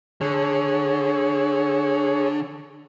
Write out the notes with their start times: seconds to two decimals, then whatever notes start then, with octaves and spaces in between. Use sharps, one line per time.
0.21 D3 G#4 C#5